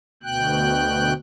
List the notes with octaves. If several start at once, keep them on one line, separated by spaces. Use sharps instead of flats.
D2 B2 G5 F#6